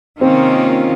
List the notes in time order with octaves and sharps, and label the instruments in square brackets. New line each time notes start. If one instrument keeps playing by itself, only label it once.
[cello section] C3 D#3 A#3 C#4 F4 [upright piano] C4